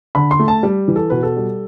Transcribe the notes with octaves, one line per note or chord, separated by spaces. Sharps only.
D3 B5
C6
A3
A5
G3
E3
A4
B2 B4
A4
G3